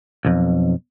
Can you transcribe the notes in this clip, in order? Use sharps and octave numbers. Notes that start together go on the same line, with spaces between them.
B1 F2